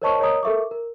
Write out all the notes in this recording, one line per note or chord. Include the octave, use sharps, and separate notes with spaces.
A#4 C5 C#5 D#5 A5 C#6
A#4 C#5 D#5 A#5 D#6
A4 A#4 E5 C#6 D6
A#4